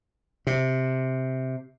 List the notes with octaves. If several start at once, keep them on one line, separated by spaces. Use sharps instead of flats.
C3